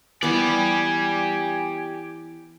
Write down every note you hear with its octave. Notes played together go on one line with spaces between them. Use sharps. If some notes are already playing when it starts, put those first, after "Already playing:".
E3 B3 G4 D5 G#5